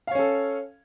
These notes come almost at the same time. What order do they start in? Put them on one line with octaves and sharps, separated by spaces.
F5 C#5 C#4 A4